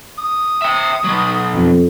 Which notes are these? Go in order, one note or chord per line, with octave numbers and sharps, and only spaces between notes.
D#6
E5 G5
B2 F#3
F2